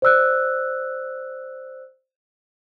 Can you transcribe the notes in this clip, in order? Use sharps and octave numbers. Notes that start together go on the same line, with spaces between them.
C5 D5 E6 F#6